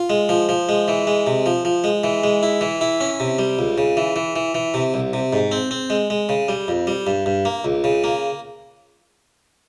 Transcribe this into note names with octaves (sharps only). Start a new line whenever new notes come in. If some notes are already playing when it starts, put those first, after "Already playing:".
Already playing: F4
G#3
F3
F3
G#3
E3
G#3
C3
F3
F3
G#3
E3
G#3
E4
E3
E4
C#4
C3
G3
C#2
C#3
E3
E3
E3
E3
C3
C2
C3
G#2
C4
C4
G#3
G#3
C#3
G3
F2
G3
G2
G2
A#3
C#2
C#3
A#3